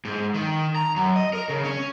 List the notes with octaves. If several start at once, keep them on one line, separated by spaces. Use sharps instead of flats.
G#2
D#3
A#5
F#2
D#5
A#4
C#3
C#4